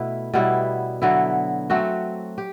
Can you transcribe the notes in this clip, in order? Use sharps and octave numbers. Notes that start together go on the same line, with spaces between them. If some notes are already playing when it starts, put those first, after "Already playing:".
Already playing: B2 A3 E4 B4
B2 G3 B3 E4
D3 F#3 B3 E4
F#3 A3 C4 F#4
G4